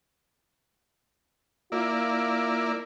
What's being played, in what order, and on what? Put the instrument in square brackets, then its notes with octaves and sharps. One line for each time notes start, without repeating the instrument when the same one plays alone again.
[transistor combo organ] A#3 E4 D5 [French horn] F4